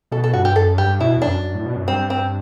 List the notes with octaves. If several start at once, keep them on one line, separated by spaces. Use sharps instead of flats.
B2 A4
A4
G2 F#4
G4
F#2 A4
G2 G4
B2 E4
E2
F#2 D4
F#2
A2
B2
F#2
G2 C4
C4